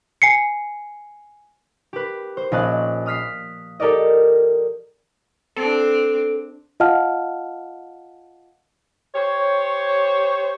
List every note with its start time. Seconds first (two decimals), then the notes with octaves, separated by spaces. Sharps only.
0.22 G#5 C7 C#7
1.93 G4 B4
2.37 C5
2.52 A#1 C#4 D#5 A5 F#6
3.06 D#6 F6 B6 C7
3.80 G4 A4 A#4 D5 D#5
5.56 C4 D4 A4
6.80 F4 D#5 F5 F#5 A5 F6
9.14 G4 C5 C#5